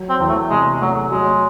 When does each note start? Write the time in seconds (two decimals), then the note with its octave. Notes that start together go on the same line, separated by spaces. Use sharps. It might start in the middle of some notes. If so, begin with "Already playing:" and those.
Already playing: F#3
0.09 C4
0.20 E2
0.29 A3
0.50 C3 G#3
0.81 F#3 A3
1.11 F#3 G#3